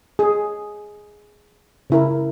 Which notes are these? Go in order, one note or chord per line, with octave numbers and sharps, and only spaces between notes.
G#4
C#3 E4 A#4